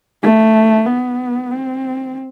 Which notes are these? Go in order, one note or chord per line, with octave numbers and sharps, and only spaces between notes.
A3
B3
C4